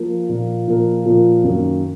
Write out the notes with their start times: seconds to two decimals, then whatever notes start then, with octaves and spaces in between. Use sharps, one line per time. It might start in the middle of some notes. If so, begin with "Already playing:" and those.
Already playing: F3 A#3
0.29 A#2 F3 A#3
0.67 A#2 F3 A#3
1.05 A#2 F3 A#3
1.43 F#2 D#3 A#3